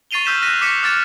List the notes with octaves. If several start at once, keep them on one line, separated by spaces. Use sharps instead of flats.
C#6 A6 C7 D#7 F7 G7
C#6 E6 F6 G6 B6 E7
E6 F#6 A#6 B6 D#7 F7
D6 E6 B6 C#7 E7
D6 F6 A6 D7 E7